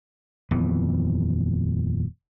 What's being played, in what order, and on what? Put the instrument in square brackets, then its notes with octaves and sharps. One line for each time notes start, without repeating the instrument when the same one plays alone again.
[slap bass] D#1 F2 E3 B3